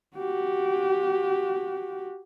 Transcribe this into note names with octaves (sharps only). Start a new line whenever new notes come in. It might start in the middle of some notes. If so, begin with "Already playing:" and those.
F#4 G4